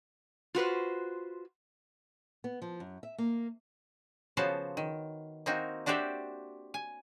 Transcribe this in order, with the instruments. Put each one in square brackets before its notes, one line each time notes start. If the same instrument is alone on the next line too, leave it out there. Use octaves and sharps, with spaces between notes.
[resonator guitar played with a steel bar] F4 F#4 B4 C5
[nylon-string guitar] B3
F3
F#2
E5
A#3
[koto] C#3 F3 B3 F#4 C5 A5
D#3
A#3 C4 D#4 F#4
D4 F#4 G4 C5 D5 E5
G#5